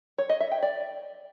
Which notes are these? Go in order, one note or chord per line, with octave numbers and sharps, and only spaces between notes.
C#5
D#5
E5
G5
D5